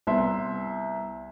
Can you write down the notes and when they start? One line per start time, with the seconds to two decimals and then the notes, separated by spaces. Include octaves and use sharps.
0.07 C2 B3 E5 C6